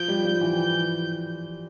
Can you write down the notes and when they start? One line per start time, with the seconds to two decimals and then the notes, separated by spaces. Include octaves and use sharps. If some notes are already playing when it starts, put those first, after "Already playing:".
Already playing: F3 G6
0.08 G3
0.24 F3
0.41 E3